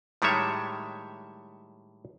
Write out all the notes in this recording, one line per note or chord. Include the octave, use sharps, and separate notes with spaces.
A2 D#3 G3 G#3 C#5 E5